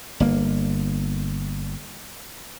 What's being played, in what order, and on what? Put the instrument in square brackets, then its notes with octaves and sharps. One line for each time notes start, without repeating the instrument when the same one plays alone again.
[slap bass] G1 A#3